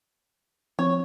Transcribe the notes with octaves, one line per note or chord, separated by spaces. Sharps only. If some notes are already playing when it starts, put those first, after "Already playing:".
F3 C4 C#5